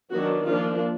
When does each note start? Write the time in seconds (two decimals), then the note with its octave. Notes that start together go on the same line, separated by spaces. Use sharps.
0.12 D#3 F#3 B3 D4 F#4
0.46 F3 A#3 D4 F4